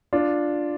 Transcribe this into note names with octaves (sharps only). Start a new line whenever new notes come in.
D4 F4